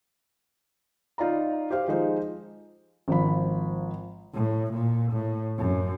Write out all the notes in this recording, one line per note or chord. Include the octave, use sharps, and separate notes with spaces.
D#4 F4 D5 A#5
G4 C5 F5
F3 G#3 D#4 C5
G#1 F3 B5
A2
A#2
A2
F#2